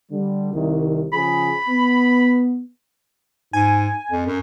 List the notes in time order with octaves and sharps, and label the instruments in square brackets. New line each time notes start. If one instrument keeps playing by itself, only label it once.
[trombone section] D3 G3
C2 D#3
[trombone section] C#3 F3 G#4 [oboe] B5
[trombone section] B3
[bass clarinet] G#2 [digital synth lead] G#5
[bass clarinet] F2
F#2